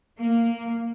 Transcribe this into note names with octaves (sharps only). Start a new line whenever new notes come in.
A#3